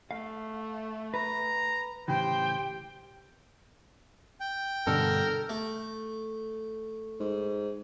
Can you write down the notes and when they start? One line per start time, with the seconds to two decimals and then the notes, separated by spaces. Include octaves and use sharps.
0.11 A3 F5
1.14 B4 A#5
2.08 A2 C#3 E3 G4 C5 G5
4.40 G5
4.87 G2 B2 D3 A4 A#4
5.49 A3
7.20 G#2